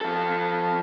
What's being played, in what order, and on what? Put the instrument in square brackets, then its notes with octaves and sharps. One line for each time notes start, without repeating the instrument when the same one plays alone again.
[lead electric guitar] F3 A4